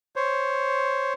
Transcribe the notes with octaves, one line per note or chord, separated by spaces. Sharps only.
C5 C#5